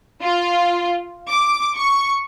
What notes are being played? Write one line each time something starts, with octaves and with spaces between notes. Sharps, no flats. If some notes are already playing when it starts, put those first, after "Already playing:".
F4
D6
C#6